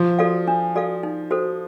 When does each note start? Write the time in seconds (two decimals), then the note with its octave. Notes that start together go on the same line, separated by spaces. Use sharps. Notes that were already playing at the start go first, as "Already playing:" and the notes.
Already playing: F3
0.19 F#4 A4 D5 F5
0.47 D4
0.75 F#4 A4 D5 F5
1.03 D#4
1.31 F#4 A4 C5